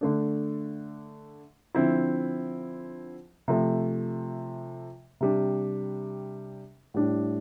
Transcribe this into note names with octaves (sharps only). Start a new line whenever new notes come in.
D3 A3 D4
D3 F3 C4 E4
C3 F3 A3
C3 G3 D4
A2 G3 D4